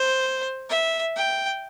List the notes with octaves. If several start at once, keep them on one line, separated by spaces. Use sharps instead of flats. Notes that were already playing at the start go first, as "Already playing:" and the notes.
Already playing: C5
E5
G5